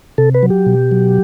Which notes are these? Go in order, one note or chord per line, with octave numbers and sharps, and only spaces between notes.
C3 A4
B4
F#3
G4
B2
F#3